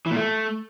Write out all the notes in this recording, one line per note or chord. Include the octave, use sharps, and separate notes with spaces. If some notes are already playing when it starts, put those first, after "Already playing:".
E3
A#2
A3